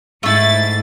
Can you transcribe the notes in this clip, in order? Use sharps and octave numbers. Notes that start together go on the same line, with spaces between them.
G#2 A3 E4 A6